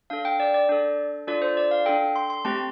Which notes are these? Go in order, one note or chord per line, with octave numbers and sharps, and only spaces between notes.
D4 A4 F5
G5
D5
D5
D4 A4
D4 F4 A4 D5
C5
D5
F5
D4 A4 G5
C6
C6
A3 C4 G4 A5